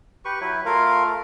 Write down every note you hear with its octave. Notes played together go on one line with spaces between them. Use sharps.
G4 B4 C#6
F#3 E4 B4
A3 F4 A#4 F5